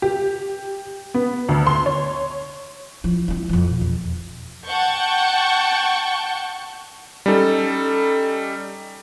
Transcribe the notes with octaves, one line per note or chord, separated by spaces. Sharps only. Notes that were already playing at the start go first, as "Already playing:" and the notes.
G4
B3
D2
C6
C#5
F3 E4
C4 E4
F2 F3
B2
E2
F#5 G5 A5 C#6 G6
G3 C#4 D#4 A4